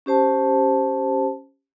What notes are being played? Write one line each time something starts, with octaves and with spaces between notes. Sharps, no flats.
C#4 G4 C5 A5